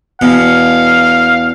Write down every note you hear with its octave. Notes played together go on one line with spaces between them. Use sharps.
E2 B2 F5